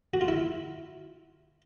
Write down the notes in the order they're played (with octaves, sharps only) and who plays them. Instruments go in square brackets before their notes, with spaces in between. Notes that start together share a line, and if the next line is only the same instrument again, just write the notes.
[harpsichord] F#4
F4
E4